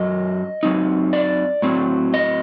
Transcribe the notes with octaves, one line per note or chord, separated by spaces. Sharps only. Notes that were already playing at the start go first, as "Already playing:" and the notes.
Already playing: F#2 F#3 D#5
F#2 F#3 C4 D#4
D5
A2 F#3 C4
D#5